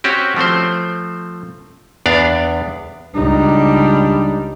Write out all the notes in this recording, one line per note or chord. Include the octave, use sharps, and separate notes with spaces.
C4 C#4 F#4 G4
F3 A3 C4 C5
E2 B3 D4 D5 F5
C#2 G3 D4 D#4